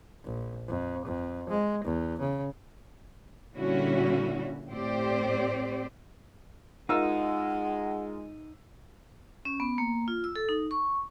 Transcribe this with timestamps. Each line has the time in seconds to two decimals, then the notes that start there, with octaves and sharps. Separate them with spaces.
0.24 A#1
0.68 F2
1.05 F2
1.49 G#3
1.84 E2
2.20 C#3
3.56 A#2 D3 G3 C#4 E4 F#4
4.69 A2 C4 G4 C5 D5
6.89 G#3 D#4 F4 A#4 F#5 E6
9.45 C#4
9.60 B3
9.78 A#3
10.08 F4
10.24 E6
10.36 A4
10.49 D#4
10.71 C#6